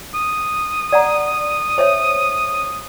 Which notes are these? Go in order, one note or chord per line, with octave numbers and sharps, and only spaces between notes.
D#6
D5 F#5 A#5
C5 C#5 E5